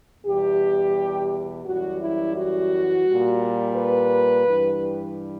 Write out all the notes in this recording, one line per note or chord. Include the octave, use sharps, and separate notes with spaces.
E2 B2 G3 G4
F#2 E3 G3 F#4
E4
F#4
A#2 G3
B4
G2 E3 G3